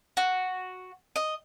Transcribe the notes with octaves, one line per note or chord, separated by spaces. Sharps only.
F#4
D#5